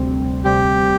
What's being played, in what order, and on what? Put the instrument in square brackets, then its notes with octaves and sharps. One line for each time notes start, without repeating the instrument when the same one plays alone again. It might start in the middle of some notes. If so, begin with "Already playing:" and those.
Already playing: [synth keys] D2 C3 G3 C4
[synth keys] D2 C3 G3 C4 [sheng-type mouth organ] G4